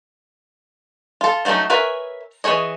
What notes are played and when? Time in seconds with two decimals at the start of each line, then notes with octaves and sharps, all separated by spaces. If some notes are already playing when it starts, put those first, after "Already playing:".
1.21 F4 A4
1.45 F#3 A3 C4 C#4 D#4
1.70 A#4 B4 C#5 E5 G#5
2.44 E3 C4 G#4 C#5 D#5